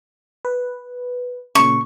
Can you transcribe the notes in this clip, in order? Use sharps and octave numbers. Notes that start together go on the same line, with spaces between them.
B4
A#2 C#3 C#6